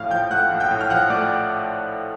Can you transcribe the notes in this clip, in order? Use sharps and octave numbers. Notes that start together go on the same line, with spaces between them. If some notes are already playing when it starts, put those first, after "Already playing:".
Already playing: A#1 A2 F5 F6
F3 G5 G6
A3 F#5 F#6
A#1
G5 G6
A2
F6
F3 F#5 F#6
A3 D5 D6